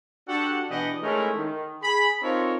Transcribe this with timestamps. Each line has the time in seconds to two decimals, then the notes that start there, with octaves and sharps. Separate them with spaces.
0.28 D4 F#4 G4 A4 F#5
0.69 B2 E3 D4 G4 D#5 F#5
1.03 G#3 A3 C#4 D#4 E4 A#4
1.37 D#3
1.82 G#4 B5
2.23 C4 D#4 F4 A4 A#4 C#5